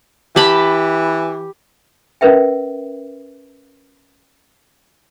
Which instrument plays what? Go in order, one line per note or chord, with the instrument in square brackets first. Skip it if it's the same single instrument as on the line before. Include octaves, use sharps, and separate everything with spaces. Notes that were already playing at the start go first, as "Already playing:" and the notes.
[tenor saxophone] E3 [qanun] G4 A5 B5
[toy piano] C#4 A#4 B4 E5 G5